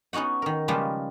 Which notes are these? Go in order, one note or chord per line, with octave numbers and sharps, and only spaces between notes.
B3 C#4 D#4 F#4 F#5
D#3 A#4
C#3 F3 G3 G#3 A#3 B4